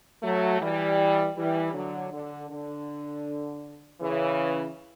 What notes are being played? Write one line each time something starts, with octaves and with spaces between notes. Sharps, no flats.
F#3 A3
E3 G3
E3 G3
D3 F#3
D3
D3
C#3 E3